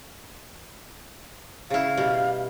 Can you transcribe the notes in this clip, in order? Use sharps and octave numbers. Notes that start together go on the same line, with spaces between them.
C#3 E4 F5
B2 G3